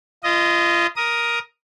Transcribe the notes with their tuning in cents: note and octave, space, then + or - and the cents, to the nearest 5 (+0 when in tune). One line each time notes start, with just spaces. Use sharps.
F4 -30 D#5 +0
A#4 +10 D#6 +0